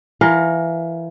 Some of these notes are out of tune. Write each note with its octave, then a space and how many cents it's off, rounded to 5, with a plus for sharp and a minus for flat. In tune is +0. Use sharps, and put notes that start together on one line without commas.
E3 +20 A#4 +0 F5 +25